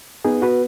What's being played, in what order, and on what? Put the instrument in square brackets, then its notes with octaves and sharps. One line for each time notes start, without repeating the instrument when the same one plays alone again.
[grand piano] B3 [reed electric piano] D#4 G#4
[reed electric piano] F#4 B4